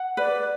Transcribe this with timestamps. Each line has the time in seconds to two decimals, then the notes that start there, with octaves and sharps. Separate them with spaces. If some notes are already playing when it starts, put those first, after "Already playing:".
Already playing: F#5
0.17 B4 D5